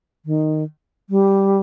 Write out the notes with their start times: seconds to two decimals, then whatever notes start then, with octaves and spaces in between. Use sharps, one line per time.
0.26 D#3
1.10 G3